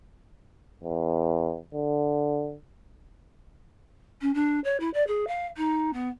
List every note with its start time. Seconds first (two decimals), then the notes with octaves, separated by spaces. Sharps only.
0.84 E2
1.74 D3
4.21 C#4
4.34 D4
4.64 C#5
4.80 E4
4.94 D5
5.07 G#4
5.27 F5
5.57 D#4
5.93 B3